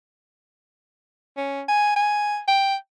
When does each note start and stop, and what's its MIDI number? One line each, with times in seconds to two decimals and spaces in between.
1.37 1.63 61
1.68 1.94 80
1.96 2.40 80
2.48 2.76 79